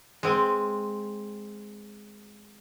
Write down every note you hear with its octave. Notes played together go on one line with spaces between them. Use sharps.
G#3 C4